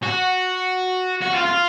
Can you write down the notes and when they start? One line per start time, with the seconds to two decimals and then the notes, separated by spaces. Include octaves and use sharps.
0.03 F#4
1.21 F#4
1.34 F4
1.45 F4